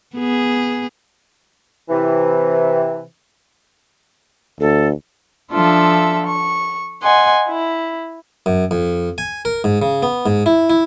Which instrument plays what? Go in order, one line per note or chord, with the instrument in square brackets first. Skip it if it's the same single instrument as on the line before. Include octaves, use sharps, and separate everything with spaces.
[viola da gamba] B3 G#4
[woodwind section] C3 E3
[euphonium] D2 [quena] A4
[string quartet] F3 D4 F4 A4 E5
C#6
D#5 F#5 G#5 C6
E4
[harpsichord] F#2
F2
G#5
A#4
G#2
C#3
B3
G#2
E4
E4